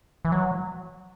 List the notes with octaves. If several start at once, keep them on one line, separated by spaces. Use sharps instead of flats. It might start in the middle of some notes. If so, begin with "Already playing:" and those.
E3
F#3